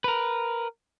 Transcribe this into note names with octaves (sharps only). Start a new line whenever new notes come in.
A#4 B4